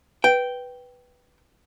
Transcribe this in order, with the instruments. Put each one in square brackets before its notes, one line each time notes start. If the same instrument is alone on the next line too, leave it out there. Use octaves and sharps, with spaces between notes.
[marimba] B4 [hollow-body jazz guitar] G5